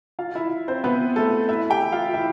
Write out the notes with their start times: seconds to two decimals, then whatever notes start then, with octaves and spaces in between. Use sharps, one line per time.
0.19 F4 F5
0.35 E4 E5
0.68 C4 C5
0.84 B3 B4
1.16 A3 A4
1.49 E4 E5
1.70 G4 G5
1.92 F4 F5
2.14 E4 E5